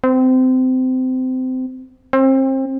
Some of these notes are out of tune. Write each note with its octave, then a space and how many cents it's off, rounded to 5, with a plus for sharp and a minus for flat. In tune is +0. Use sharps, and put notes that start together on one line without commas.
C4 -25
C4 +30